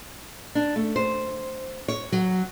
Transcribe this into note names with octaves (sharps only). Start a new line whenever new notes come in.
D4
A3
C5
C#5
F#3